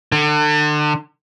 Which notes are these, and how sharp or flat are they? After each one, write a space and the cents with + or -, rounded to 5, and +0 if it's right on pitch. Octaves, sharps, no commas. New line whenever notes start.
D3 +35